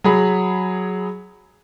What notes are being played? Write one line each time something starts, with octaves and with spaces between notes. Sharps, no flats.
F#3 G#4 B5